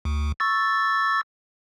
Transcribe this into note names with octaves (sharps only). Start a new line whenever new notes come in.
D2
C#6 E6 A6